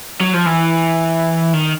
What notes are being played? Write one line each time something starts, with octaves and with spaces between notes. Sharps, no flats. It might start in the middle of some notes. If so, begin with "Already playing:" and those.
F#3
F3
E3
D#3